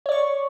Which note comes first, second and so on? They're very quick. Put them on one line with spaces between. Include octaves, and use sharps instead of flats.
C#5 D5 C#6